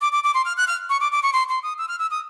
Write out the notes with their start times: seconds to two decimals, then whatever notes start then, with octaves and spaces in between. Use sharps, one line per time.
0.01 D6
0.13 D6
0.24 D6
0.34 C6
0.45 F6
0.57 F#6
0.68 F6
0.90 C#6
1.01 D6
1.12 D6
1.23 C#6
1.33 C6
1.49 C6
1.63 D#6
1.78 E6
1.88 F6
1.99 E6
2.11 D#6